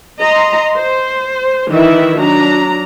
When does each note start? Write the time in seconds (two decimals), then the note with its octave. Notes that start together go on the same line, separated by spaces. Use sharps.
0.19 D#5 A#5 C6
0.76 C5
1.69 D#3 E3 E4 E5
2.17 F#3 D4 A#5